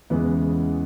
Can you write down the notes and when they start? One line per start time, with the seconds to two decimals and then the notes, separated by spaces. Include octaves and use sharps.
0.10 E2 C#3 E3 G#3 B3